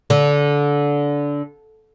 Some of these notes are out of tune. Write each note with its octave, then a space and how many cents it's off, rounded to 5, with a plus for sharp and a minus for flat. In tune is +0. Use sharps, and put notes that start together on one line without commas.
D3 -20